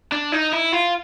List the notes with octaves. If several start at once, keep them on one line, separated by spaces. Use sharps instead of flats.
D4
D#4
E4
F4